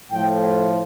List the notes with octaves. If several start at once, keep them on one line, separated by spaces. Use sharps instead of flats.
A2 F3 A3 G5